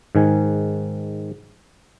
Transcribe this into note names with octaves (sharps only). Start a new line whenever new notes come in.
G#2 D#3 G#5